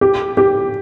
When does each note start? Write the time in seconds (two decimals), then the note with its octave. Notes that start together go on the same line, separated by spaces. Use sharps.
0.01 G4
0.37 G4